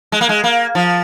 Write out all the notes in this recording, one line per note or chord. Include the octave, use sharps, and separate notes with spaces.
G#3
A#3
G#3
A#3
F3